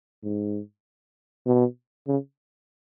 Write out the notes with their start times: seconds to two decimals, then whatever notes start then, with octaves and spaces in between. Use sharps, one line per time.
0.24 G#2
1.46 B2
2.08 C#3